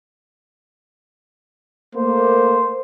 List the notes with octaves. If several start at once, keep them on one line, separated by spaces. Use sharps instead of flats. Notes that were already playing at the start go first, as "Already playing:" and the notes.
A3 A#3 C5